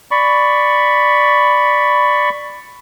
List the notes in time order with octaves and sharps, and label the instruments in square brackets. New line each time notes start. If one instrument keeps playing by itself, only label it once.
[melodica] D5 B5 C#6